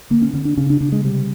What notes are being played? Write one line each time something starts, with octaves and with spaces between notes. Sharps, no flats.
D3 A#3
C#4
D3 C#4
D4
C#3 C#4
D4
C#3 D4
G#3
C3 G3